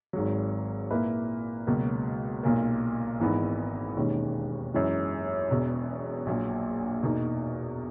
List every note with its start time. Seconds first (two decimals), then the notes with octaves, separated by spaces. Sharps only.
0.13 G#1 G#2 F#3
0.91 A#2 A#3 E4 B4
1.67 C#2 B2 F#3 A#3
2.43 B1 A#2 A#3
3.20 G#1 G#2 E3 B3 D#4
3.96 E1 D#2 D#3 G#3 C#4
4.74 F#2 E3 G#3 C#4
5.50 E1 E2 B2
6.26 A#1 A#2 F#3
7.03 E2 B2 A#3 D#4